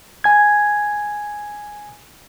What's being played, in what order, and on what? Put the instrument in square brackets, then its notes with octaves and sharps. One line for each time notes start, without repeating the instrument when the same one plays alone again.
[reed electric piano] G#5 G#6